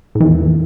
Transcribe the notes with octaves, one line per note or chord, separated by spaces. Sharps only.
A2
E3
E2